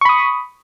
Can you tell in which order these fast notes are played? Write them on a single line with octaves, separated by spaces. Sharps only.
C#6 B5 D#6